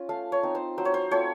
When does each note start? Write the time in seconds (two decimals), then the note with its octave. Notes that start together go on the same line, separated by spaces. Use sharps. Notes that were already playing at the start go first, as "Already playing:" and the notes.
Already playing: C#4 F4
0.09 A3 F5
0.32 C#5
0.43 C4 D#4
0.55 C5
0.78 F#3 C5
0.85 C#5
0.94 C5
1.11 A3 C4 F4 C#5